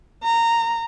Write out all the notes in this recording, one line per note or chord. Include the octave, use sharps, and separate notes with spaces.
A#5